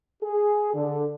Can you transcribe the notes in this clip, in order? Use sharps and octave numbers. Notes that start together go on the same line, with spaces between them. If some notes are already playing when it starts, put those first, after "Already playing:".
G#4
D3